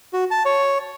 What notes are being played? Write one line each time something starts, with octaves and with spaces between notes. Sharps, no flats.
F#4
A5
C#5